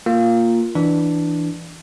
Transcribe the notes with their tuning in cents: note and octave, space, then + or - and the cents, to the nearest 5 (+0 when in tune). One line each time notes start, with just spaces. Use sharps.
A#3 -5 F4 +0
E3 +0 D4 +0 D5 +0